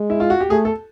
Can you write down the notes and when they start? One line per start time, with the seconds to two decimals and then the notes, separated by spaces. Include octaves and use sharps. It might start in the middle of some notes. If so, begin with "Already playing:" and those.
Already playing: G#3
0.10 E4
0.20 F4
0.30 F#4
0.40 G4
0.50 A3 G#4
0.65 A4